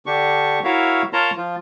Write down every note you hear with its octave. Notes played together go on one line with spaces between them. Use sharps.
D3 D4 G4 C#6
E4 F#4 A#4 C#5 E5 F5
F4 A#4 C#5 A5 A#5 C6
F3 F4